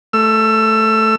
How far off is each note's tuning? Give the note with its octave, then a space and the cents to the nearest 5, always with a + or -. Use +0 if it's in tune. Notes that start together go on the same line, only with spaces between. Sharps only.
A3 +0 E6 +25